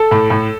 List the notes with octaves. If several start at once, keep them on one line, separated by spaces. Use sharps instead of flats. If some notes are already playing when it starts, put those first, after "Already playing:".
Already playing: A4
A2
A2